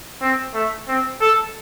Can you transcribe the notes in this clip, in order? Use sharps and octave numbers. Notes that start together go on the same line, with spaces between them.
C4
A3
C4
A4